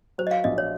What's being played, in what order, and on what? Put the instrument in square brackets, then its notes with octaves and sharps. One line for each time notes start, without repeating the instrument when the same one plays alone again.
[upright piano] F#3 [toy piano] C5
[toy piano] D#5
F5
[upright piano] A#1 [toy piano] D#5
[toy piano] C#5